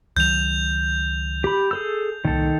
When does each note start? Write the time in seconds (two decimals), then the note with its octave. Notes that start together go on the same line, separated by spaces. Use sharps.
0.17 C#2 D#3 F#3 G6 F7
1.44 G4 B5
1.71 G#4 A4 E6
2.25 C2 A#2 D#3 A4